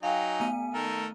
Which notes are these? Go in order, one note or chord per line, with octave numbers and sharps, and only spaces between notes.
F#3 D#4 F5 G5 G#5
A3 B3 D#7
D#3 A4 A#4 A#5